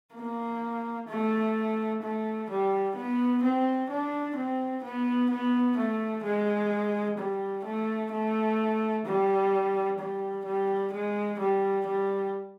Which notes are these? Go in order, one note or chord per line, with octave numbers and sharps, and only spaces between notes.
A#3
A3
A3
G3
B3
C4
D4
C4
B3
B3
A3
G#3
G3
A3
A3
G3
G3
G3
G#3
G3
G3